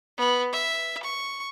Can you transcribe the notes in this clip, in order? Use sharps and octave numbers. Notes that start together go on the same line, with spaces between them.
B3
E5
C#6